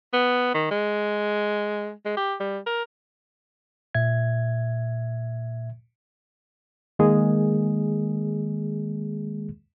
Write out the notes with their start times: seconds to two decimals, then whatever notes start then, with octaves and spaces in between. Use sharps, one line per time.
0.13 B3
0.54 D#3
0.71 G#3
2.05 G#3
2.17 G4
2.40 G3
2.66 A#4
3.95 A#2 E5 G#6
6.99 D#3 G#3 A#3 G#4